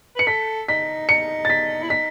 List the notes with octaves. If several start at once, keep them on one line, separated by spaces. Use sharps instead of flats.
B4 C#7
A4 B6
D#4 B6
D#4 C#7
A6
B6
E4
D#4 B6